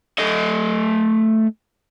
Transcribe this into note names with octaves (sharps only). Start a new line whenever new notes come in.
A3 D#5